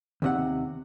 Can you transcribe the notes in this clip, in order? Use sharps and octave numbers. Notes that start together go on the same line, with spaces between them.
D#2 C3 F#5